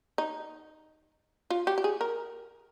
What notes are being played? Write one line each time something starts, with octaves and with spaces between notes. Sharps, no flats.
D#4
F4
G4
G4
G#4
A#4